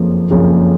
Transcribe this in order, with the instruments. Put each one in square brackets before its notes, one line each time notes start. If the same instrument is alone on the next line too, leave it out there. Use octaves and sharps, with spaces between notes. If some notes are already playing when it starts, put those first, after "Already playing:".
Already playing: [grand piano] F#1 F2 C#3 F3 A#3
F#1 F2 C#3 F3 A#3